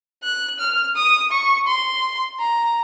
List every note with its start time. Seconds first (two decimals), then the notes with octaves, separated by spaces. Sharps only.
0.23 F#6
0.60 F6
0.96 D#6
1.32 C#6
1.68 C6
2.40 A#5